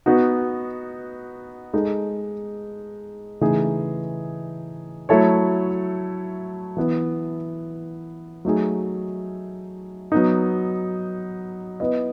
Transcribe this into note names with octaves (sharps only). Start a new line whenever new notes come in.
B3 D#4 F#4
G#3 D#4 A4 D#5
C#3 E3 A3 D#4 G#4
F#3 A3 E4 A4 C#5
E3 B3 E4
F#3 A3 D#4 G#4
F#3 B3 D#4
B3 E4 B4 D#5